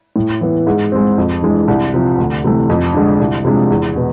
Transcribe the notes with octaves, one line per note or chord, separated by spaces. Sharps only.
A2
E3 B3
G#2
G#3 C4
F2
E3 G#3 D4
C2
C3 F3
D2
C3 E3 A3
F2
D3 G#3 D4
C2
C3 F3 G#3 D4
E2
B2 B3